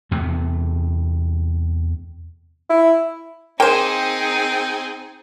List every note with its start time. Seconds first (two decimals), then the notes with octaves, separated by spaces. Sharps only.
0.11 E2 C3 A3
2.70 E4
3.60 A#3 C4 D#4 G#4 C5 G5